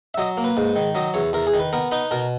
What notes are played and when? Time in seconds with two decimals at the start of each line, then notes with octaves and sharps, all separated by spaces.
0.14 E5
0.18 F#3 D#5
0.37 A#3
0.44 B4
0.57 G#2
0.76 D#3
0.95 F#3 D#5
1.14 E2 C#5
1.33 E2 A#4
1.47 G#4
1.54 D#3
1.59 B4
1.73 B3 A#4
1.92 D#4 B4
2.11 B2 A#4